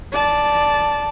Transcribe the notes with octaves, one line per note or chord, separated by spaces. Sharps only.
D5 A5